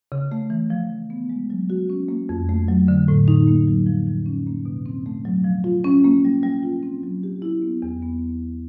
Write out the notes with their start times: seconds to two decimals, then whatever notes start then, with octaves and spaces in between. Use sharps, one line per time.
0.12 C#3
0.32 A3
0.50 E3
0.70 F3
0.90 F3
1.10 B3
1.30 G#3
1.50 F#3
1.70 F#4
1.90 C#4
2.09 A#3
2.29 F2
2.49 A3
2.68 F#3
2.88 D3
3.08 A2
3.28 D#4
3.47 A#3
3.68 F#3
3.86 F3
4.07 F3
4.26 C#4
4.47 A#3
4.65 B2
4.86 C4
5.06 A3
5.25 F#3
5.44 F3
5.64 F4
5.84 C#4
6.04 A#3
6.25 G3
6.43 G3
6.63 F4
6.83 C4
7.03 F#3
7.23 G4
7.42 E4
7.62 B3
7.82 E2
8.02 B3